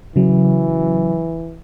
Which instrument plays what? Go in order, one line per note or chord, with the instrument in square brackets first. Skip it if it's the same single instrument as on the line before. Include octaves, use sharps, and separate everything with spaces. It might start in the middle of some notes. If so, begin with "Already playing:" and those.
[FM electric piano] C#3 F#3 [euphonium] E3